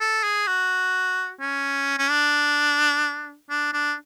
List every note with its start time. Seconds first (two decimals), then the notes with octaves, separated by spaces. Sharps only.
0.01 A4
0.23 G#4
0.47 F#4
1.41 C#4
1.98 C#4
2.10 D4
3.50 D4
3.73 D4